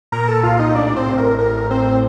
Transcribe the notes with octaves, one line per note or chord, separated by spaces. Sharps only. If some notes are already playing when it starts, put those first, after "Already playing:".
A#2 A#4 A#5
A4 A5
C2 F4 F5
D#4 D#5
A2 D4 D5
C4 C5
A1
A#4
A2 A#4
A1 C4 C5